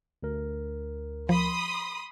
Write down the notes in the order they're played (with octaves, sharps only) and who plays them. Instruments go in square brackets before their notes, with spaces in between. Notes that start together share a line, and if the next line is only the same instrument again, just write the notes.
[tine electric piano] D2 A#4
[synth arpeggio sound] F3 [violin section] B5 C6 D#6